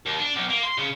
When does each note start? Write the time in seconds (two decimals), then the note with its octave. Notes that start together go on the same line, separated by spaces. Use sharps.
0.06 D#2
0.19 D4
0.36 B1
0.50 A#3
0.63 C6
0.78 C#3